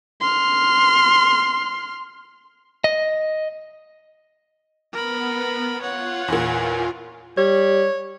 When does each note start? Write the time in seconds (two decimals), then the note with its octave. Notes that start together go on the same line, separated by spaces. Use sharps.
0.21 C6 F6
2.84 D#5
4.93 B3 A#4 B5
5.82 F4 C#5 F#5
6.28 E2 A#2
7.37 G3 C#5